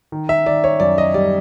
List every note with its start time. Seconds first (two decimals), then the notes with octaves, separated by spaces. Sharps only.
0.12 D#3
0.29 E5
0.46 D#3 D5
0.64 C#5
0.80 F#2 D5
0.98 D#5
1.14 G3 D5